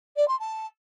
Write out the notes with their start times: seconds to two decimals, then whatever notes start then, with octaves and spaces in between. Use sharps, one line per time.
0.16 D5
0.28 C6
0.39 A5